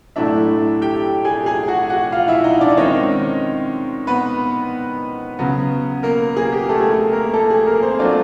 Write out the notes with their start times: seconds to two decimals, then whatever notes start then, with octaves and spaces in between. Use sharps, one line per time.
0.16 A2 F#3 A3 D4 E4 E5
0.82 G4 G5
1.25 G#4 G#5
1.46 G#4 G#5
1.68 F#4 F#5
1.90 F#4 F#5
2.12 F4 F5
2.28 E4 E5
2.44 D#4 D#5
2.61 D4 D5
2.77 D#3 G#3 C4 C#4 D#4 C#5
4.07 B3 B4
5.39 C#3 F#3 B3
6.03 A#3 A#4
6.37 G#4
6.53 G4
6.69 A3 A4
6.81 G#4
6.90 A3 A4
7.12 A#3 A#4
7.34 A3 A4
7.50 G#4
7.66 A#3 A#4
7.82 C4 C5
7.99 F#3 A3 D4 F4 D5